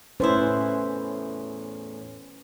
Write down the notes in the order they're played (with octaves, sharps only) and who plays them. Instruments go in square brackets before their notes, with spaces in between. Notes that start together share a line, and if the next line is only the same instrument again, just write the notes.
[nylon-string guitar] E2 A2 E4 [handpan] C#4 B4 C5